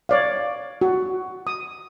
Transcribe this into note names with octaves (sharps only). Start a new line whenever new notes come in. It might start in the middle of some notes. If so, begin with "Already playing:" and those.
C#5 D5 F5
F#4
D#6